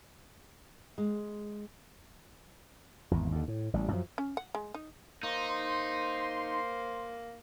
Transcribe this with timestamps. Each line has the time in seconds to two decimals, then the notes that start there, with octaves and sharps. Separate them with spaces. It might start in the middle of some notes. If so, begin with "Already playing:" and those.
0.98 G#3
3.11 G#1 E2
3.32 D#2 D3
3.48 A2
3.73 A1 G3
3.92 F#2 F3
4.18 C#4
4.37 F#5
4.55 G#3
4.74 D#4
5.23 A#3 D#4 C5 C6